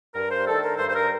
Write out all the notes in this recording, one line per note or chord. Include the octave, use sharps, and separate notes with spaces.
G2 A#4
C5
D#3 A3 D4 A4
A#4
G2 C5
C5
A#4